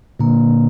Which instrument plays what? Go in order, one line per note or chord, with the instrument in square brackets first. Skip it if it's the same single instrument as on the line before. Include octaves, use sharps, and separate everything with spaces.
[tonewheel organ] A#2 D3 [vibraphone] A#3